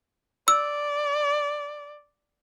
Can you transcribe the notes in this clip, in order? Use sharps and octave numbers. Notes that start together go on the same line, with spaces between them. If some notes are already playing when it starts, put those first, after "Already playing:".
D5 E6